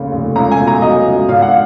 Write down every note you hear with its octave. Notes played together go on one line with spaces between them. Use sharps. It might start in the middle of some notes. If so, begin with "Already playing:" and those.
Already playing: F1 D#2 C#3
F1
C#2 A#5
G#5
B2
A#5
F#3 D#5
C#2
G#1 F5
F#5